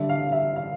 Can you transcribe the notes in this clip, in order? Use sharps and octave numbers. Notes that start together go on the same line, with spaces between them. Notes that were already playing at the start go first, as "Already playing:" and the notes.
Already playing: D3 G3 D4 E5
F5
E5
F5